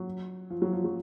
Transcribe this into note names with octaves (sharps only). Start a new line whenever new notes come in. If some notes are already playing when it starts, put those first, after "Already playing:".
Already playing: F#3
F3
F#3
F3
F#3